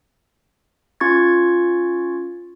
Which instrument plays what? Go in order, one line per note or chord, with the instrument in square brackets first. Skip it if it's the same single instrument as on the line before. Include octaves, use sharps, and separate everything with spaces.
[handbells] C#4 F4 C#6 G#6 A6